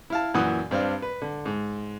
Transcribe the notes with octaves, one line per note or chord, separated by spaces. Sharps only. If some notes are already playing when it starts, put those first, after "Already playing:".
E4 F5 A5
F#2 A#2 E3 F#5 D#6 F#6
G2 C4 D4 F5
B4
D3
G#2